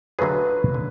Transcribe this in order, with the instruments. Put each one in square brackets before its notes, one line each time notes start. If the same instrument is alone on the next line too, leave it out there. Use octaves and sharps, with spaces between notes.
[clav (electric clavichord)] D3 F#3 A3 F4 G#4 [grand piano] B4
[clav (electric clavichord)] D3